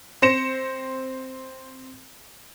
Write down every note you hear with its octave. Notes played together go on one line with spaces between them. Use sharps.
C4 C5 A#6 C#7 E7